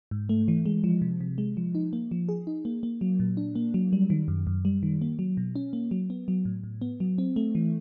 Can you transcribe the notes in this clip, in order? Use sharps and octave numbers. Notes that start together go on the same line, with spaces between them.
G#2
A3
E3
G#3
F3
C3
C3
G#3
F3
D#4
A#3
F3
G#4
D#4
A#3
A#3
F#3
A#2
D4
A#3
F#3
G3
D#3
F#2
F#2
G3
D#3
A#3
F#3
B2
C#4
A#3
F#3
B3
F#3
A2
A2
B3
F#3
C4
A3
E3